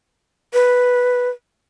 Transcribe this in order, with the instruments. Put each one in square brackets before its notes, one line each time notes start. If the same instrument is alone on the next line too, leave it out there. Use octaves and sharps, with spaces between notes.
[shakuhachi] B4